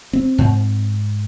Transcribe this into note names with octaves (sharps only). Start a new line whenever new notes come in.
C4
G#2